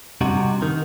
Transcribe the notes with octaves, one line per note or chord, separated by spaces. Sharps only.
G2 C3 D#4 F#4
D#3